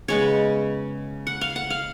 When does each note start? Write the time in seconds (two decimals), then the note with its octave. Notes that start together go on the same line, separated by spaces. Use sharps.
0.08 C#3 G#3 B3 C#5
1.27 F#5
1.41 F5
1.56 F#5
1.70 F5